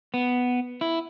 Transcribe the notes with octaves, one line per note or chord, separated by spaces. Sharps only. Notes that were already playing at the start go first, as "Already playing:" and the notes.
B3
E4